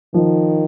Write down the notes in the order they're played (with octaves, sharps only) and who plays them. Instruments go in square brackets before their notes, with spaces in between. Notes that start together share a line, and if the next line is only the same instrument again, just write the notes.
[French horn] D#3 [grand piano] F3